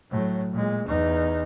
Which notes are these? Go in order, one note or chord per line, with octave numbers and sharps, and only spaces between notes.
A2 F#3
A#2 G#3
E2 D#4